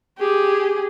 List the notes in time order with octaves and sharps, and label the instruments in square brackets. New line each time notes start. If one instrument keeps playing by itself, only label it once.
[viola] G4 G#4